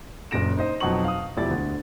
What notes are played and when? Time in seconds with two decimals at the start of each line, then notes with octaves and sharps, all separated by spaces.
0.31 F#1 F#2 A#2 A#6 D7 E7
0.57 D#4 C5 D#5
0.80 F2 B2 F#3 D#4 C#6 F#7
1.04 F5 D#6
1.37 E1 F3 E4 G4 D5 A6
1.51 D2